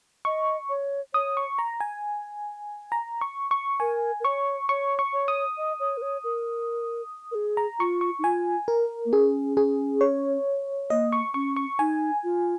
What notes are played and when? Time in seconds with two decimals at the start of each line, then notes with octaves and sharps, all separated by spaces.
0.25 D#5 C#6
0.69 C#5
1.14 C#5 D#6
1.37 C#6
1.59 A#5
1.80 G#5
2.92 A#5
3.21 C#6
3.51 C#6
3.80 A#4 G#5
4.20 A#4
4.25 C#5 C#6
4.69 C#5 C#6
4.99 C#6
5.13 C#5
5.28 D#6
5.57 D#5
5.80 C#5
5.97 A#4
6.02 C#5
6.24 A#4
7.31 A#4
7.35 G#4
7.57 A#5
7.79 F4 C#6
8.01 C#6
8.19 D#4
8.24 F4 G#5
8.68 A#4
9.05 A#3
9.12 C#4 G#4
9.57 G#4
10.01 C#5
10.90 A#3 D#5
11.12 C#6
11.34 C#4 C#6
11.56 C#6
11.79 D#4 G#5
12.24 F4